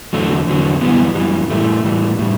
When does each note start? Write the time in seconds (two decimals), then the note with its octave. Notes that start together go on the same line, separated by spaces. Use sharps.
0.13 E2 D3 F#3 A3
0.48 E2 D3 F#3
0.81 F#2 E3 G3 B3
1.15 F#2 E3 G3
1.50 A2 E3 G3 A3
1.84 A2 E3 G3
2.19 A2 G3